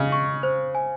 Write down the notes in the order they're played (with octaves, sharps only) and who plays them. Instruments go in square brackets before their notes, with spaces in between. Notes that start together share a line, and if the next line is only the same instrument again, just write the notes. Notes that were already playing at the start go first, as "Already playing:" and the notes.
Already playing: [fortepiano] C#3 [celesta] D#5
[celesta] C#6
C5
G#5